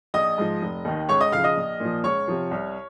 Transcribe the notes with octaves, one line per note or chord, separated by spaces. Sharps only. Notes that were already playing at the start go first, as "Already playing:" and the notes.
A#1 D#5 D#6
G#2 F3
F1
D#2 D#3
C#2 C#5 C#6
D#5 D#6
C#3 F3 F5 F6
D#5 D#6
A#1
A#2 F3
C#2 C#5 C#6
C3 F3
C2